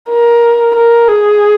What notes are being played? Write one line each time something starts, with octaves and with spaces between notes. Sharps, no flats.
A#4
A#4
G#4